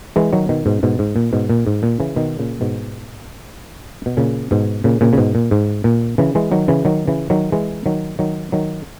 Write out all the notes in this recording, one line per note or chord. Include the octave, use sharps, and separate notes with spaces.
E3 G#3
D#3 F#3
B2 D#3
G#2 B2
G#2 B2
G#2
A#2
G#2 B2
A#2
G#2
A#2
C#3 E3
B2 D#3
A#2 C#3
G#2 B2
B2
A#2 C#3
G#2 B2
A#2 C#3
A#2 C#3
C#3
G#2 B2
A#2
G#2
A#2
C#3 E3
E3 G#3
D#3 F#3
C#3 E3
D#3 F#3
C#3 E3
D#3 F#3
E3 G#3
D#3 F#3
D#3 F#3
D#3 F#3